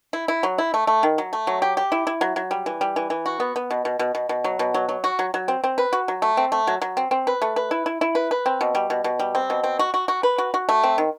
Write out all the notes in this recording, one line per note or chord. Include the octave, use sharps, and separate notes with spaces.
E4
E4
F#3
E4
A3
A3
D#3
F#3
A3
F#3
G4
G4
E4
E4
F#3
F#3
G3
E3
G3
E3
E3
F#4
B3
B3
B2
B2
B2
B2
B2
F#3
B2
F#3
F#3
F#4
F#3
F#3
C4
C4
B4
F#4
F#3
A3
C4
A3
F#3
F#3
C4
C4
B4
A3
B4
E4
E4
E4
B4
B4
C4
B2
G3
B2
B2
G3
C4
B2
C4
F#4
F#4
F#4
B4
F#4
F#4
A3
C4
D#3